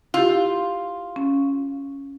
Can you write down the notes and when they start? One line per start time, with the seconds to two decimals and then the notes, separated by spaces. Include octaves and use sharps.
0.14 E4 F4 G4
1.16 C#4